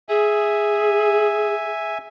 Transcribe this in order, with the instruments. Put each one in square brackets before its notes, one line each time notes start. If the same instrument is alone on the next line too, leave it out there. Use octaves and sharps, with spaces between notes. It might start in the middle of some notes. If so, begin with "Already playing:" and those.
[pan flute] G#4 [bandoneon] E5 G#5